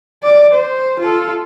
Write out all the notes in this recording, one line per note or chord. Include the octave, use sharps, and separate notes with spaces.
D5
C5
F4 A4